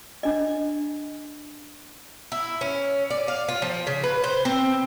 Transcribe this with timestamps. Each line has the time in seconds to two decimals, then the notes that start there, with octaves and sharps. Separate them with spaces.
0.23 D4 D#5
2.32 E4
2.61 C#4
3.10 D5
3.28 F5
3.49 F4
3.62 F3
3.87 C#3
4.04 B4
4.24 C5
4.45 C4